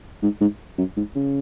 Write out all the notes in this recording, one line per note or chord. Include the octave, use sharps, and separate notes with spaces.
G#2
G#2
F#2
G#2
C#3